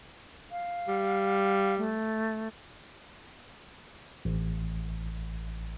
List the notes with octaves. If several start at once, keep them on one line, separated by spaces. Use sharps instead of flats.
F5
G3
A3
A1